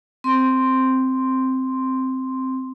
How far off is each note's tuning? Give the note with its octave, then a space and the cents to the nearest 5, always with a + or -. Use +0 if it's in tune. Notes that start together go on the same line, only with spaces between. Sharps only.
C4 +0 C6 +0